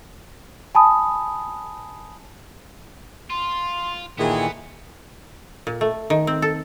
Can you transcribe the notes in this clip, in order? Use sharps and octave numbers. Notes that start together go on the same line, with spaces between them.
G#5 A5 B5 D#6
F4 C6
A#2 D#3 E3 B3 G#4 A4
A#2
A3
D#3
C4
A4